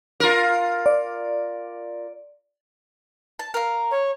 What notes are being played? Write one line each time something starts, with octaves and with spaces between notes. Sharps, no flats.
F4 A#4
D5
A5
A#4 F5
C#5